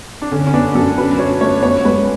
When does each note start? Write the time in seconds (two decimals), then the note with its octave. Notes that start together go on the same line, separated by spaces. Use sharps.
0.22 D4
0.32 D3 C#4
0.47 C#4
0.54 B3 D4
0.75 F#2 A4
0.98 F#3 B4
1.19 F#2 C#5
1.41 A3 C#5
1.63 B3 C#5
1.85 G#3 B4